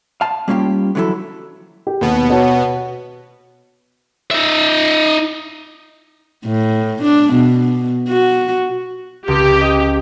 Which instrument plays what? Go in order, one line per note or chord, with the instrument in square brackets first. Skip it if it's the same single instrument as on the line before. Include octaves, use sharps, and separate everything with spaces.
[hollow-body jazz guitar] F5 A5
G3 A#3 C#4 F4 G4
D3 E3 F#3 E4 A4
[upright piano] G4
[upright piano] D#2 [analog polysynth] B2 B3
[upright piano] F#4 C#5 A5
[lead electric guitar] D#4 E5
[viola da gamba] A2
D4
B2
F#4
[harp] C#2 [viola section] G4
[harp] D#5